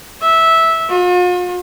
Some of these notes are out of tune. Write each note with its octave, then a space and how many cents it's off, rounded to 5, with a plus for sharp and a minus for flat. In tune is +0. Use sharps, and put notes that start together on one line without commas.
E5 -10
F4 +45